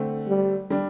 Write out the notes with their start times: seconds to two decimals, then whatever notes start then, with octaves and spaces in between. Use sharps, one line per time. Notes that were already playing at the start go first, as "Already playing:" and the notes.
Already playing: D3 A3 C4
0.28 G3
0.70 G3 D4